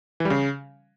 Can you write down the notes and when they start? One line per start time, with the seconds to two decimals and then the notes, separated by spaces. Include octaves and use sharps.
0.20 E3
0.25 G3
0.30 C#3